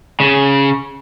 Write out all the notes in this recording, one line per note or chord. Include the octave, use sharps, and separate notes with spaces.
C#3